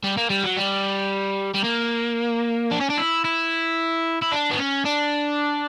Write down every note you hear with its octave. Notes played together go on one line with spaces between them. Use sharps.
G3
A#3
G3
F#3
G3
G3
A#3
D4
C#4
D4
E4
E4
E4
D4
B3
C#4
D4